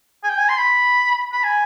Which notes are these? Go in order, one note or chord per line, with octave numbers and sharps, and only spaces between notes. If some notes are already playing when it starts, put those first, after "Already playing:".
G#5
G5
G#5
C6
B5
B5
G#5